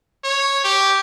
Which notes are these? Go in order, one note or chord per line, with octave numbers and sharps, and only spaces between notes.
C#5
G4